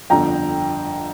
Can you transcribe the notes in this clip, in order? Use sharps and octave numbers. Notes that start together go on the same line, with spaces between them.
G1 F2 D3 G5 A#5